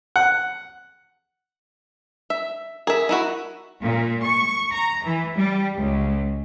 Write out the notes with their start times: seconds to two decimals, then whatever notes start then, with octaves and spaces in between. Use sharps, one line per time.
0.16 F#5
2.30 E5
2.87 G#4 A#4 E5
3.09 D#4 E4 F#4
3.82 A#2
4.23 C#6
4.72 A#5
5.04 E3
5.35 G3
5.76 C#2